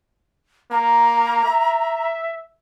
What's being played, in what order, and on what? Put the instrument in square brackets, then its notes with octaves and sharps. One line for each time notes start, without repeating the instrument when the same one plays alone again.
[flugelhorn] A#3 [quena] A#5
[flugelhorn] E5